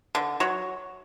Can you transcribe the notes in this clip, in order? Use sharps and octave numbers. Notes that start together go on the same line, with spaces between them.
D3
F#3 C#5